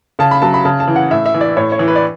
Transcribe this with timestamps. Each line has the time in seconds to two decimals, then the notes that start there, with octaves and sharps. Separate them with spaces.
0.19 C#3 A5
0.31 B5
0.42 F#3 A5
0.54 B5
0.65 C#3 A5
0.80 A5
0.88 E3
0.96 F#5
1.11 A2 E5
1.26 E5
1.34 E3
1.41 D5
1.57 A2 C#5
1.72 C#5
1.79 E3
1.88 B4
1.96 D5